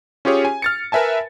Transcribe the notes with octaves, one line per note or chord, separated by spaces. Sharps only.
C#4 F4 G4 G#4 C#5
G#5
F6 A6 C#7
A#4 B4 E5 G#5 A5